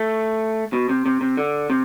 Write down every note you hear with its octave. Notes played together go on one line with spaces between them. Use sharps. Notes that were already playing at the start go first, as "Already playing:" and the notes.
Already playing: A3
B2
C3
C3
C3
D3
C3